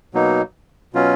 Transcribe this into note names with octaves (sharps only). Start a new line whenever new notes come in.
B2 F#3 A#3 D#4
B2 F#3 C#4 F4